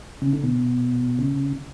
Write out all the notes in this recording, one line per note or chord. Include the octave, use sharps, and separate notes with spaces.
C#3
D3
B2
C#3